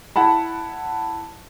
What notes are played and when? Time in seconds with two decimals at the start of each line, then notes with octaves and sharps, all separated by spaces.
0.16 E4 F#5 A5 B5